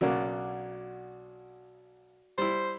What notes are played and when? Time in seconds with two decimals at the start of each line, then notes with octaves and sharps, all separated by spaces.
0.01 B1 C#3 A#3 F#4 D5 F#5
2.38 G3 E4 C5